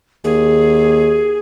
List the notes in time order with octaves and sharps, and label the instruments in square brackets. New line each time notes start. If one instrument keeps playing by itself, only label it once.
[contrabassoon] D#2 [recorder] G#4